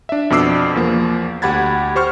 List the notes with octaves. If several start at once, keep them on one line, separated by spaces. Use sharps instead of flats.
D4 E5
F2 B2 D4 D6 E6 C7
E2 F3 A#3
D2 G4 F#5 B5 G#6 A6
G4 C5 C#6 F6